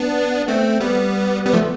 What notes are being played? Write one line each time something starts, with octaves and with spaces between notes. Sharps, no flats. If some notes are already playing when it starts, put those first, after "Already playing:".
Already playing: B3 D4
A3 C4
G3 B3
G3 B3
F3 A3